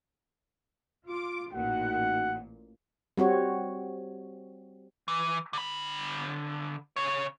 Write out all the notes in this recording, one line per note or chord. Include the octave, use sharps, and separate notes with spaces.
F4 D6
A1 A#2 D#4 F#4 F#5
G3 C4 F#4 C#5
E3
D3 B5
C#3 C#5